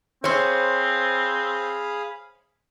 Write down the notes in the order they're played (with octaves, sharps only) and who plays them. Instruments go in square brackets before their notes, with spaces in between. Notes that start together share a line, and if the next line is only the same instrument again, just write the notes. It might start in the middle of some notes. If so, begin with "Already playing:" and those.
[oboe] C4 [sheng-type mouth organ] G#4 F5 B5 [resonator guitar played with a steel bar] C5 C#5